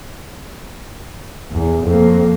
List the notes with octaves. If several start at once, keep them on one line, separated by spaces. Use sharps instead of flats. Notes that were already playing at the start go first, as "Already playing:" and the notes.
E2
F2 A#3